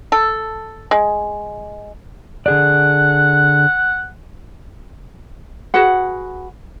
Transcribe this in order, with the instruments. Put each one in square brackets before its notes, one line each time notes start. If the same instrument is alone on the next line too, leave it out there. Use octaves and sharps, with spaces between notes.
[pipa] A4
G#3
[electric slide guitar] D3 G#4 D5 [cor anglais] F#5
[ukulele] F#4 G#4 B4 F#5